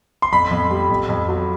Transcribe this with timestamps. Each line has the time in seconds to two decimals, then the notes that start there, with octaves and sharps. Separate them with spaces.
0.22 C6
0.33 F2 B5
0.51 F2
0.71 G3
0.90 F2
1.09 F2
1.28 F#3